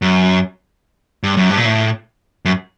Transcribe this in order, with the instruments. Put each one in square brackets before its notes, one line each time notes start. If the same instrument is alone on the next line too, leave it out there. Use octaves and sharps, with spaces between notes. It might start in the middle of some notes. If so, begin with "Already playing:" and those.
[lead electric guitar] F#2
G2
F#2
G2
A#2
A2
F#2